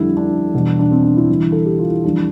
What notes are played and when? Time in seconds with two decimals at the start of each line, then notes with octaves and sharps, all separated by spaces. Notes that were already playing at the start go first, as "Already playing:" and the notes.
Already playing: F2 D3 G3 E4
0.17 D4
0.54 E2 B2 G3
0.79 D4
0.91 C4
1.03 D4
1.17 E4
1.29 E2 D3 G3
1.52 A4
1.66 G4
1.79 F4
1.91 E4
2.04 F2 E3 G3 D4